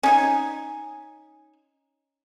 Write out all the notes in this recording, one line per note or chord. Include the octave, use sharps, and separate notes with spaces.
C#4 D#4 G#5